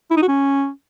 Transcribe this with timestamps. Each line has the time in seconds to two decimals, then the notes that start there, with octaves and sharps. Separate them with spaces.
0.11 E4
0.17 D#4
0.22 F#4
0.28 C#4